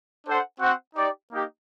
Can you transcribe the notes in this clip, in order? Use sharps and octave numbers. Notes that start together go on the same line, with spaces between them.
D4 A4 C5 F#5
C4 F#4 C5 F#5
D#4 G4 D5
A#3 D#4 G4